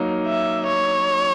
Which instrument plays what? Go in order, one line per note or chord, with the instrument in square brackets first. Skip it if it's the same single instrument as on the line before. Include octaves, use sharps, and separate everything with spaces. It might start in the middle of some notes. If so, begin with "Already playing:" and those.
Already playing: [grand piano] F#3 A#3 D#4
[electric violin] E5
C#5